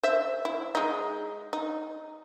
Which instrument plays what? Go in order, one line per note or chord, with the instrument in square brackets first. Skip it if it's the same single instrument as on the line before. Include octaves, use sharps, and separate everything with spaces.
[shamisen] C5 E5
E4
G#3 D#4
D#4